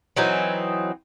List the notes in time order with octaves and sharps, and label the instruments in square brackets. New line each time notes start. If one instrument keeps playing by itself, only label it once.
[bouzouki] E3 F#3 C4 D#4